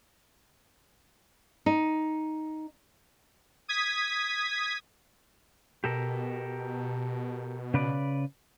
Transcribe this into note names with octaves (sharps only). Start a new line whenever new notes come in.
D#4
D#6 G#6 B6
B2 G4 A4 A#4
C#3 B4 D5